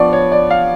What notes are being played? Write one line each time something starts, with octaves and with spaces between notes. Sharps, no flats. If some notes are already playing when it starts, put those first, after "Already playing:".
Already playing: F3 B3 D4 D5 C#6
C#5
D5
F5